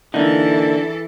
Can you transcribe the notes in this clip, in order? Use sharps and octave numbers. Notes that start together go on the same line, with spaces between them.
D3 E3 A#3 D#4 A4